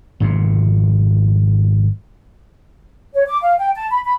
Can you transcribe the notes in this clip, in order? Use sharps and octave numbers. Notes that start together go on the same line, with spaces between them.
G#1 F2 C3
C#5
D6
F5
G5
A5
B5
B5